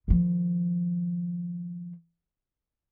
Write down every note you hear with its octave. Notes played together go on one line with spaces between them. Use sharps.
D#3 F3